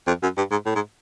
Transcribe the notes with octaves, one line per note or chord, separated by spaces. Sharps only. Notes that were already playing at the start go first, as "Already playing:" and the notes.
F2
F#2
G2
G#2
A2
G#2